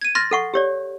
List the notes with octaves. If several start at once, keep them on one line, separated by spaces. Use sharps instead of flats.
G#6 D#7
C6 F6 A6 A#6
A4 F#5 C#6
G4 C#5 D5